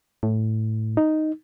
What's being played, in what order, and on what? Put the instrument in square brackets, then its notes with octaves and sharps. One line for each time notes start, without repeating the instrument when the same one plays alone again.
[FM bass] A2
[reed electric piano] D#4